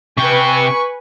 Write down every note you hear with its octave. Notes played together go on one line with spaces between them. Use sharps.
C3 B4 G5 G#5 C#6